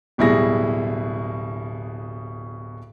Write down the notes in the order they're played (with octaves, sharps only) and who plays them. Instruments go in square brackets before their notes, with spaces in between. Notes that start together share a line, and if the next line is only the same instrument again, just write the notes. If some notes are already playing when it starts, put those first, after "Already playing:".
[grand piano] D1 B2 G3 E4 G#4 A#6